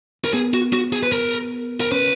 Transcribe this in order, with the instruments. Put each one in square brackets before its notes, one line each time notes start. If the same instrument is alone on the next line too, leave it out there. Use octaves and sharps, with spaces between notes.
[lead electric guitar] A#4
[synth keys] B3 [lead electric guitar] G#4
[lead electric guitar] F#4
F#4
G#4
B4
A#4
A#4
[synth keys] C#4 [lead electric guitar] B4